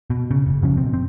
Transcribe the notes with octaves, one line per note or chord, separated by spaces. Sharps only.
B2
C#3
F#1
F#2 C#3 F3 C#4
F#2 B2 C4
C4